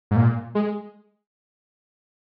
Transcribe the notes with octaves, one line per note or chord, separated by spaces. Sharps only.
G#2
A#2
G#3